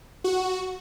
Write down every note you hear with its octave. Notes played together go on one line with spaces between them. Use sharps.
F#4